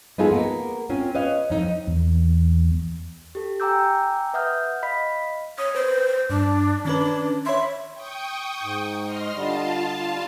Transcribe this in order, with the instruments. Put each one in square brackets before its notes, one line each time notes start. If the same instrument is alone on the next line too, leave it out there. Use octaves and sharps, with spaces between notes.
[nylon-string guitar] B3 D#4 F4 G#4 A4
A#3 B3
C4 C#4 F4
B4 C#5 D#5 F5
F2 D#4
[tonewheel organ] E2
[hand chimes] G4 A4
G5 G#5 A#5 D6 E6 G6
B4 E5 F#5 D#6 F6 G6
D#5 F5 B5 B6
[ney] C#5 [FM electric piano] D#6
[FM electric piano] B4 [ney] C5
[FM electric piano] G2 [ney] D4
[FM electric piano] D#3 C#4 B4 [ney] D4
[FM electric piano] C#5 B5 C6 [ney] E5
[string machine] G5 C#6 D#6
[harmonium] G#2
[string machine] D#5 C6 F6
[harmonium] D3 G3 [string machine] F4 F5 A5